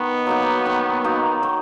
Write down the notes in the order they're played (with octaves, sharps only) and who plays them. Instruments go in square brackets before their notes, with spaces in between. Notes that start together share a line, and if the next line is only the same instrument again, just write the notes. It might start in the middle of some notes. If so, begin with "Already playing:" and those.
Already playing: [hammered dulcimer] D#3 [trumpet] B3
[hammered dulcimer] F#3 A#3 D#4
D#3
F#3 A#3 D#4
D#3